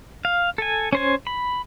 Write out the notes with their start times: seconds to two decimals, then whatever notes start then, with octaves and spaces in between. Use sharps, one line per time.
0.25 F5
0.58 A4 G#5
0.93 C#4 C5 G#5
1.27 B5